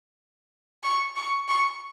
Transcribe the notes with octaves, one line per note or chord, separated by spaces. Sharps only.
C#6
C#6
C#6